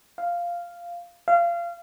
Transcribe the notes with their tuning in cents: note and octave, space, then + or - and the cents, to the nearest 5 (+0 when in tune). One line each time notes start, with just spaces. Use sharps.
F5 -5
F5 -25